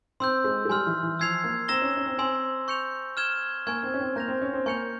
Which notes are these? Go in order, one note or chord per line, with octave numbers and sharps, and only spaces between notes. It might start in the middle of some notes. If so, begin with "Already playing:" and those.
C4 C6 E6 G6
G#3
G#3
G3 G#5 C6 F6
E3
E3
F3 E6 G#6 C7 F7
A#3
C4 A#5 E6 A#6 E7 G7
C#4
C#4
C4
C4 G#5 C6 E6
C#6 G6 C#7 F7
F6 G#6 E7 G7
A#3 G#5 C#6 F6 G#6
C4
C#4
C4
A#3 G6 A#6 F7
C4
C#4
C4
A#3 G#5 C#6 G6 C#7 F7